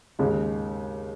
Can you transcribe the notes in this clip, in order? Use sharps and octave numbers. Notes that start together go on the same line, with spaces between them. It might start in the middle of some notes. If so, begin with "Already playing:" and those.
D#2 C#3 G#3